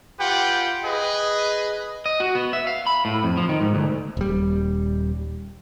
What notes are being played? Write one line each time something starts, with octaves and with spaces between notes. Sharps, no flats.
F4 G4 B4 F#5 G5
G#4 B4 D#5
D#5
F#4
B3
E5
F5
B5
A2
F2
F3
D#3
G#2
D2
D#1 G3